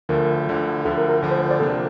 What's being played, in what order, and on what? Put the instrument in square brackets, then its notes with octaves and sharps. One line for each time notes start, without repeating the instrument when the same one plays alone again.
[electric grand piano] D2 D3 F3 [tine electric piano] A#4
[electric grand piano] D2 D3 F3
[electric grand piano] D2 D3 F3 [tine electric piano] A4
[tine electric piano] A#4
A#4
[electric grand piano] D2 D3 F3
[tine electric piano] C5
C5
D5
[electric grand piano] C3 F3 A#3 D4 [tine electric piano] A4